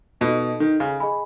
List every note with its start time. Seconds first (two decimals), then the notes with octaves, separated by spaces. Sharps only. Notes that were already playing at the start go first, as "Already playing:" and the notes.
0.21 B2 D#4 A4 D#5
0.60 D#3
0.80 C#3
1.00 G#4 D#5 G#5 B5